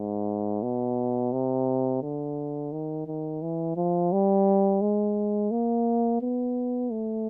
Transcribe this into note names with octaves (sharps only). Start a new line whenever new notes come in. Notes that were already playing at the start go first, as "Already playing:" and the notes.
Already playing: G#2
B2
C3
D3
D#3
D#3
E3
F3
G3
G#3
A#3
B3
A3